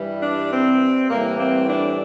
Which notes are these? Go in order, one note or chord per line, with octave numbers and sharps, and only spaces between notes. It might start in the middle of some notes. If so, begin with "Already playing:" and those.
Already playing: G2 E3 G3
D4
C4
A2 E3 G3 A#3
C4
D4